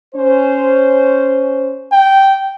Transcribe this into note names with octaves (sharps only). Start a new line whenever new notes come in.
C#4 C5
G5